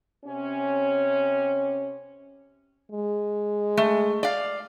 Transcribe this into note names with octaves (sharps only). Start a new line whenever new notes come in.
C3 C#4
G#3
A3
D5 F5